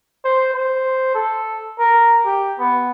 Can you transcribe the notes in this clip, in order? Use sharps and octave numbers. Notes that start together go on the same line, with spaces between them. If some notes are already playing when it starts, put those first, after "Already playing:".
C5
C5
A4
A#4
G4
B3